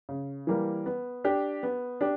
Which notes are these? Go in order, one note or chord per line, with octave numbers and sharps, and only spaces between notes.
C#3
E3 G3 A#3
B3
D4 G4
B3
D4 G4